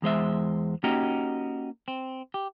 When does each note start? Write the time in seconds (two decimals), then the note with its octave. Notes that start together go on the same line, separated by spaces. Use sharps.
0.02 E2 G#3 C5 E5
0.84 A#3 C#4 D#4 F#4 G4
1.88 C4
2.34 G4